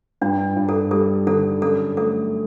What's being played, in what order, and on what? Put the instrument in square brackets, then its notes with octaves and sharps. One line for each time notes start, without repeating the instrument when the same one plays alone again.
[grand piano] G2 [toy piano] D4
[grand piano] G2
[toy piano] A4
[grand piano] G3 [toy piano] A4
[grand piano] D3 [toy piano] A4
[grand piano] F#2 [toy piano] A4
[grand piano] A3 [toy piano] A4